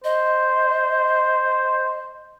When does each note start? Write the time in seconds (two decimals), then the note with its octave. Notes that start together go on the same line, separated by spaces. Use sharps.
0.04 C5 D#5